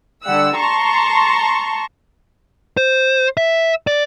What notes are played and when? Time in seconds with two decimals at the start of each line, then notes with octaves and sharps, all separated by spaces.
0.24 D3 G3 F#5 E6
0.56 A5 A#5 C6 C#6
2.77 C5
3.37 E5
3.87 D5